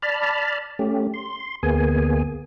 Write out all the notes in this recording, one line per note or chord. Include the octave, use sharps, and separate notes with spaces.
D5 A5 B5 F6
A3 C#4 G4
C6
D2 A#3 B3 G#4 G#5